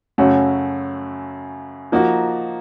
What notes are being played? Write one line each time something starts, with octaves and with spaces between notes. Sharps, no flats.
F#2 C#3 A3 C#4 F#4
F3 A#3 D#4 F#4